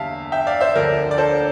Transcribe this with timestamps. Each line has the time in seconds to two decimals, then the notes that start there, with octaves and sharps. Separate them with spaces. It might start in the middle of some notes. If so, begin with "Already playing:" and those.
Already playing: E2 D3 G3 E5 F5 A5
0.32 E5 G5
0.47 D5 F5
0.61 C5 E5
0.75 D2 D3 F3 A#4 D5
1.11 D5
1.18 A4 C5